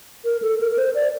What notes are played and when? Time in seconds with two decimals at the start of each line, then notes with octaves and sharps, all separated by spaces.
0.25 A#4
0.42 A4
0.61 A#4
0.71 A#4
0.78 C5
0.95 D5